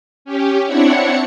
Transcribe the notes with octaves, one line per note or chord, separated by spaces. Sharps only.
C#4 G4
C4 D4 E4 C#5 F#5 C#7